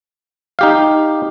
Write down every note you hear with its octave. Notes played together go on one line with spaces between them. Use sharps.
D#4 G4 F5